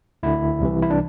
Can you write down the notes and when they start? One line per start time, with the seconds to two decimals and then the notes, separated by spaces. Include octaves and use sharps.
0.23 D2 D3 E4
0.61 C2 C3 E3
0.82 E4
0.90 D4